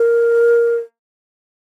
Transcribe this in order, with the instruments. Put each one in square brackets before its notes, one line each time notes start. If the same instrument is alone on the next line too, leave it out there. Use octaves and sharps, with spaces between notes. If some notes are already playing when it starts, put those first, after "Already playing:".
Already playing: [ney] A#4